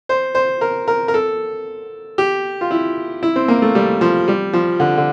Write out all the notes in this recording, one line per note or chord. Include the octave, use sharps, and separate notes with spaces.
C5
C5
A#4
A#4
A#4
A4
G4
F4
E4
E4
C4
A#3
A3
G3
F3
G3
F3
D3
D3